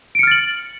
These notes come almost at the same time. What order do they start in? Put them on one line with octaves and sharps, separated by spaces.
D7 C#7 F6 A6 F#7